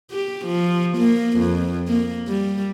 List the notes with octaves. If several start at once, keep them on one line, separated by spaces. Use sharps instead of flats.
G4
F3
A#3
F2
A#3
G3